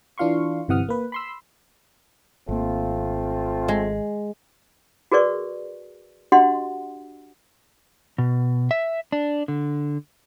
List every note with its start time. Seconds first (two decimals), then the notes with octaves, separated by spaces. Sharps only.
0.18 E3 D4 F4 F5 C6 C#6
0.68 G1 C3 E3 F#5 D#6 F6
0.89 A#3 B4
1.12 B5 C6 E6
2.49 G#1 A3 A#3 C4 F4
3.68 G#3
5.12 F#4 G#4 A#4 B4 D5 C#6
6.32 D4 F#4 G4 D#5 F#5 C6
8.18 B2
8.71 E5
9.12 D4
9.48 D3